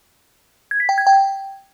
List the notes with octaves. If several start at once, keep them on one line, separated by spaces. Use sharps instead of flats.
G#6
B6
G5
G#6
G5